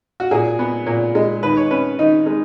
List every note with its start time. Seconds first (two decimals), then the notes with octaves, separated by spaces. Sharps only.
0.20 F#4
0.31 A#2 G#4
0.59 B3
0.87 A#2
1.15 G#3
1.43 D#3 B4
1.57 C#5
1.71 C#4 B4
1.99 D#3 D#4
2.26 G#3